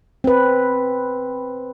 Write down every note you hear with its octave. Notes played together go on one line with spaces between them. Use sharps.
C4 B4